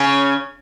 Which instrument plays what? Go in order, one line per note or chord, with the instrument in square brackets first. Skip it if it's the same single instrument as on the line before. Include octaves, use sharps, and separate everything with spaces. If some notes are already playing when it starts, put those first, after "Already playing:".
Already playing: [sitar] C#3 C#4